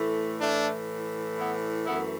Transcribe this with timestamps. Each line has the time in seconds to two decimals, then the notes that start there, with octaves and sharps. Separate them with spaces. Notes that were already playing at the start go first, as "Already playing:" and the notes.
Already playing: A2 E3 A3
0.41 A3 D4
1.38 B3 E4
1.86 F#2 E3 A3 B3 E4